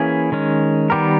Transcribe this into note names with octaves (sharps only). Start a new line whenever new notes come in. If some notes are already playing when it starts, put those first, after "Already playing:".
Already playing: E3 A#3 C#4 E4 G#4
D#3 G#3 C#4
D#3 G3 B3 G4 A#4